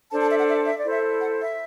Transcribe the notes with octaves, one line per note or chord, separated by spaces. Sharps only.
D4 A4 C5 A5
A5
E5
F#5
E5
E5
D5
E4 A4 C5 E5
F#5
E5